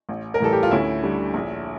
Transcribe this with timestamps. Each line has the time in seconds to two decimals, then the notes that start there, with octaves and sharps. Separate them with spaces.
0.09 A1
0.34 A#4
0.40 A2 E3 G3 A4
0.53 G4
0.63 F4
0.71 D2 C#4 E4
1.03 D3 G3
1.34 A#1